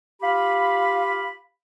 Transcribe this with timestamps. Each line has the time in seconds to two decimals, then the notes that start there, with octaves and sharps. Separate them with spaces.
0.22 F4 G4 F5 B5